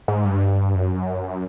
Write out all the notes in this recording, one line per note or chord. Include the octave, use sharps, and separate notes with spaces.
G#2
G2
F#2